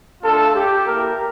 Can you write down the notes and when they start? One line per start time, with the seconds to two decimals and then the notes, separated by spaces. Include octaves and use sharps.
0.22 A3 D4 F4 A4
0.55 G4
0.86 A#3 E4 G4 A#4